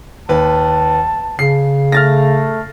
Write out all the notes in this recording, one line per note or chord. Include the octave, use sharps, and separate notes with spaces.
D#2 B4 A5
C#3 C7
A3 F6 A6 A#6